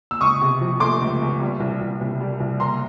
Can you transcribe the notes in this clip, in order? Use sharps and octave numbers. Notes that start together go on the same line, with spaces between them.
E6
C#2 C#6 D#6
C3
F3
A3 C6 D6
C#2
C#2
G3
C2
C2
C2
G3
C2
F#1 A#5 C6